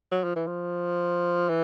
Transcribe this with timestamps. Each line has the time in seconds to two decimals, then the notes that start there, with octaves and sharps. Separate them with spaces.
0.11 F#3
0.24 F3
0.36 E3
0.47 F3
1.49 E3